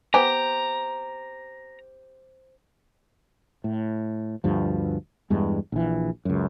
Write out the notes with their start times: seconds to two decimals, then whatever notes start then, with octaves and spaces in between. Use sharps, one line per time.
0.14 B3 G4 C5 G5 G#5 A#5
3.64 A2
4.44 D2 G2 F3
5.30 E2 G2 G#3
5.72 A#1 E3
6.25 C#2 F#2